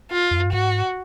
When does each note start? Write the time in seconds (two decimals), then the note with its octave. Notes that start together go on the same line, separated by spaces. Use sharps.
0.11 F4
0.31 F2
0.38 F#2
0.46 G2
0.53 G#2 F#4